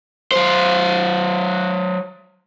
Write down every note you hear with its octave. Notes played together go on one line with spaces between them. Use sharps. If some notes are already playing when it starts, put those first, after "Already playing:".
F#3 C5